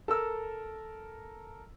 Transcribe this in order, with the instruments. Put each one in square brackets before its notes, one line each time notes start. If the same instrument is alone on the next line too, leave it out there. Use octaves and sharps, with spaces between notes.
[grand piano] A4 A#4 E6